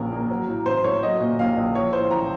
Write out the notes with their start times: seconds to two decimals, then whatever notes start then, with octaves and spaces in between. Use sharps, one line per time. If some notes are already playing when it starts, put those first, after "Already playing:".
Already playing: A#1 A#2 F3 C#4 A#4
0.12 A#3
0.30 F#3
0.48 A2
0.66 A1 C5
0.84 A3 C#5
1.03 F#3 D#5
1.20 A#2
1.39 A#1 F5
1.57 A#1
1.75 F3 C#5
1.93 A2 C5
2.11 A1 A#5